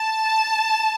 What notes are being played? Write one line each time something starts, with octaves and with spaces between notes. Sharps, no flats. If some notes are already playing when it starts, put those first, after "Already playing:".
Already playing: A5